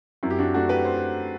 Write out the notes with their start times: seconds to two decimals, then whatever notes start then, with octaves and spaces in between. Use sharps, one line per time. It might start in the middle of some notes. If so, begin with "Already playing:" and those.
0.23 F#2 C4 E4
0.30 G4
0.38 D4 F#4
0.54 A3 D4 F#4
0.69 G4 B4
0.85 C5